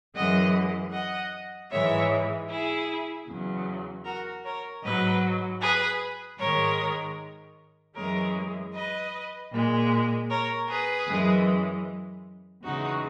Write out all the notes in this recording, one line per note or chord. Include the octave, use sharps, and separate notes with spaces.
F#2 E3 G#3 D#5 F#5
D#5 F#5
G#2 E3 G#3 C#5 E5
E4 G#4
E2 C#3 F#3
F#4 A#4
A#4 C#5
G#2 F#3 B4 D#5
G#4 B4
G#2 D#3 G#3 A#4 C#5
F#2 E3 G#3 A#4 C#5
B4 D#5
A#2 G#3
A#4 C#5
G#4 B4
F#2 E3 G#3
E2 C#3 G#3 D#4 F#4